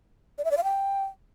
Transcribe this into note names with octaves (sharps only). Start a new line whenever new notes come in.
D5
E5
D5
F5
G5